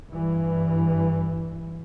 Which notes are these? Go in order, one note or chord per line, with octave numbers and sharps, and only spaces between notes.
G2 E3